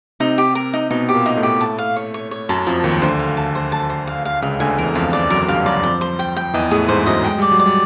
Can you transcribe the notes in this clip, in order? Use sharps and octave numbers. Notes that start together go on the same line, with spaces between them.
C3 C4 D#4
G4
A#4
D#4
B2 B3 D#4
G4
A#2 A#3
D#4
A2 A3
G4
A5
F5
C#5
C#5
C#5
F#2 F#3 A5
F2 F3 A5
D#2 D#3 C#5
D2 D3 C5
F5
A5
C5
A5
C5
F5
F5
C#2 C#3 F5
D2 D3 G#5
E2 E3 A#4
F2 F3 F5
D5
F#2 F#3 A#4
G2 G3 F5
F#2 F#3 D5
F2 F3 C5
C5
G5
G5
E2 E3 D#5
A2 A3 G#4
G#2 G#3 C5
F#2 F#3 D#5
G#3 G5
G3 D5
F#3
D5
G3